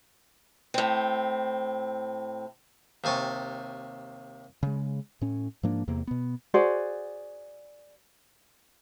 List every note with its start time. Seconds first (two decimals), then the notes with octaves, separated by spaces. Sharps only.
0.74 A2 C4
3.04 D#2 C3 G#5 A5 C#6
4.63 C#3 G#3
5.21 A2 C#4
5.63 G#2 F3 A#3 D4
5.88 E2 C3 A#3
6.07 B2 B3
6.54 F#4 G#4 C5 D5